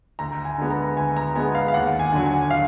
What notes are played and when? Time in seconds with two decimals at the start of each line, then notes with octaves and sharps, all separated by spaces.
0.19 D2 A#5
0.45 G#5
0.58 D3 G#3 B3
0.70 A#5
0.96 D2 G#5
1.17 A#5
1.35 D3 G#3 B3 G#5
1.55 F5
1.68 F5
1.74 D#2 F#5
1.99 G#5
2.13 D3 F#3
2.26 G#5
2.50 F5